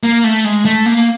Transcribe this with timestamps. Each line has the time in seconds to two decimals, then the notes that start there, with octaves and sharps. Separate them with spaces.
0.03 A#3
0.24 A3
0.45 G#3
0.65 A3
0.86 A#3